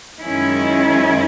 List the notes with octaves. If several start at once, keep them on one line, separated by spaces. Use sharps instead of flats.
F#2 D#3 G#3 C#4 E4